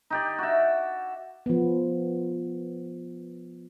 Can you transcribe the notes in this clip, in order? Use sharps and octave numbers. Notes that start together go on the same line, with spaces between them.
D#4 G4 D5
F#4 E5
F3 B3